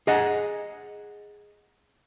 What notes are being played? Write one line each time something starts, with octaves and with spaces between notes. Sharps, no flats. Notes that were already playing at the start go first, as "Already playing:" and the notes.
G#4 D#5 F#5